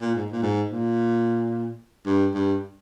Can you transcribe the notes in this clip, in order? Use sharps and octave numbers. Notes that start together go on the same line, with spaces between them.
A#2
G#2
A#2
G#2
A#2
G2
G2